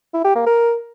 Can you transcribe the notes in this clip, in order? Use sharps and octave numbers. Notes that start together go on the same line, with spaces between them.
E4
G4
A#3
A#4